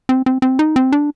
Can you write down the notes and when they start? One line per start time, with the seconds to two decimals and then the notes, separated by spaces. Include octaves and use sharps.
0.09 C4
0.26 C4
0.42 C4
0.59 D#4
0.76 C4
0.92 D4